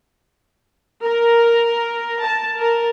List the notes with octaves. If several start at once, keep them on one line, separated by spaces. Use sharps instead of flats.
A#4
A5
A#4